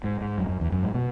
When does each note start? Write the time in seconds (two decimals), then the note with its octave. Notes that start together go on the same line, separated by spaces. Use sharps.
0.04 G#2
0.21 G#2
0.38 F#2
0.49 F#2
0.61 E2
0.72 F#2
0.83 G#2
0.94 B2